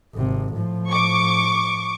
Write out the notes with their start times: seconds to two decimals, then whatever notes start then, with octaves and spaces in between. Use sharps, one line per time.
0.14 G#1 C3
0.54 A2 F3
0.88 C#6 D6